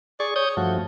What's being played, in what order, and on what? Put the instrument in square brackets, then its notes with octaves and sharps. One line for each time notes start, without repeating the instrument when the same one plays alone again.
[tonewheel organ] G#4 C#6 [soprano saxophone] D5
[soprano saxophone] C#5 [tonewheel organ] D#6 G6
[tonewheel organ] G2 F3 A3 [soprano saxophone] F#4